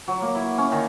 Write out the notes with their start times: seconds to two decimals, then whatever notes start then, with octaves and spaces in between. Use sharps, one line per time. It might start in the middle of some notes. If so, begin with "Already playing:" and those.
0.08 F#3
0.22 A#3
0.35 E4
0.58 C#4
0.72 D#3